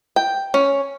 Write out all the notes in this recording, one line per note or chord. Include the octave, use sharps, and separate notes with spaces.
G5
C#4